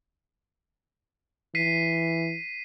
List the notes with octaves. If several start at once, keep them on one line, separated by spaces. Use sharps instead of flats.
E3 B6 C7 D#7